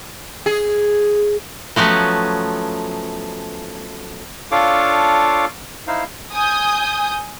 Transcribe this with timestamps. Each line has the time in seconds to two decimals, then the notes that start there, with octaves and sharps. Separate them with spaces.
0.46 G#4
1.76 F3 F#3 A3 B3 C#4
4.52 D4 F4 A4 C#5 F5 D6
5.88 D#4 E4 C5 F5
6.33 G#5 D#6 G6